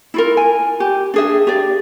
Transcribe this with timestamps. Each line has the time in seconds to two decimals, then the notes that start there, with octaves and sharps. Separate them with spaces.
0.14 E4 F4 A#4
0.37 G#5
0.80 G4
1.14 D4 G#4 E5
1.47 G4 D5